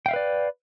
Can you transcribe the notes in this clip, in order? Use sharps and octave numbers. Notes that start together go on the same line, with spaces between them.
B4 D5 E5 F5 G5